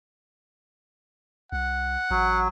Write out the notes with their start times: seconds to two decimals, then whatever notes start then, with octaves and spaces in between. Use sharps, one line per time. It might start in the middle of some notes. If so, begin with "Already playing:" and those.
1.52 C2 F#5
2.11 A1 F#3